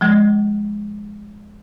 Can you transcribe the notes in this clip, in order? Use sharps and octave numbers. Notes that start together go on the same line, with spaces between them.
F3 G#3